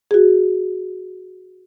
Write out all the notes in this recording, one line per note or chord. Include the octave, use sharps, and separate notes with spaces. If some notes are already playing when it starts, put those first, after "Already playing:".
F#4 G#4